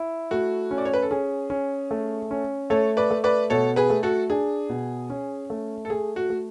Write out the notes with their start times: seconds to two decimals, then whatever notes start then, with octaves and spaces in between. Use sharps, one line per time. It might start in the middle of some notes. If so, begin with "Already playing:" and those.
Already playing: E4
0.31 A3 F#4
0.71 C#4
0.78 D5
0.85 C#5
0.94 B4
1.02 A4
1.11 C#4 G#4
1.50 C#4
1.91 A3
2.31 C#4
2.70 A3 A4 C#5
2.97 B4 D5
3.11 A3
3.24 B4 D5
3.50 B2 A4 C#5
3.76 G#4 B4
3.90 A3
4.03 F#4 A4
4.30 D4 G#4
4.69 B2
5.10 C#4
5.50 A3
5.85 A4
5.90 A3 G#4
6.16 F#4
6.30 A3